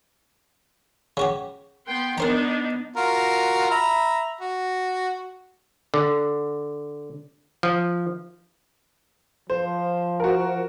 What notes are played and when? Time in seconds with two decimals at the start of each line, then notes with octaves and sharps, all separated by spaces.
1.17 C#3 F#4 G4
1.87 B3 G5 C6
2.18 B3 D4 D#4 A#4 C5 A#5
2.96 F4 F#4 A#4
3.71 E5 A#5 B5
4.41 F#4
5.94 D3
7.63 F3
9.50 F3 C5
10.20 F#4 A#4